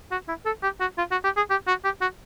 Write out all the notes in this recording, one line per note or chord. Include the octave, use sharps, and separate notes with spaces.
F#4
E4
A4
G4
F#4
F4
F#4
G4
G#4
G4
F#4
G4
F#4